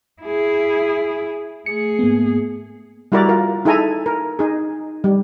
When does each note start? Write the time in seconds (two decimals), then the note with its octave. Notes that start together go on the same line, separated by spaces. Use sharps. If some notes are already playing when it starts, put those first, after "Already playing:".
0.22 E4 G#4
1.66 A3 G#4 C#7
1.99 G#2 A#3 B3
3.12 G3 E4 F#4 A#4 D5 A#5
3.29 F4 A#4
3.65 D#4 E4 G#4 A4 G#5 A#5
4.06 A#4
4.39 D#4 G#4
5.04 G3